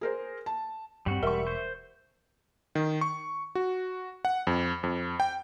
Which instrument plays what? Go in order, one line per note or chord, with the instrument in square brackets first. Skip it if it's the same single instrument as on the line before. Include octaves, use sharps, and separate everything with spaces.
[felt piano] G#4 A#4 C5
A5
[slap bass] G2 C4 [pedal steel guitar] G3 F#4
[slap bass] E1 [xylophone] A#4 [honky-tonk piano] E5 C#6
[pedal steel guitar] C5
[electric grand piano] D#3
C#6
F#4
F#5
F2
F2
G5